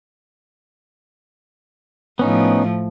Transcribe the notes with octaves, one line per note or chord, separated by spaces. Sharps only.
A2 F3 B3 C#4 D#4